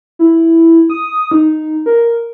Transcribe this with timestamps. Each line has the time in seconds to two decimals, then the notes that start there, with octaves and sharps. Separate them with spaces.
0.19 E4
0.90 D#6
1.31 D#4
1.86 A#4